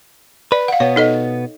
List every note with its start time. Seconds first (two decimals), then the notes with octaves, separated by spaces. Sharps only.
0.52 B4 D5
0.68 F5 F#5
0.80 B2 B3 C#5
0.96 D#4 A4 D#5